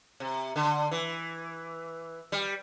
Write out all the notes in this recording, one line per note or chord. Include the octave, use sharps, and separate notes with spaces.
C3
D3
E3
G3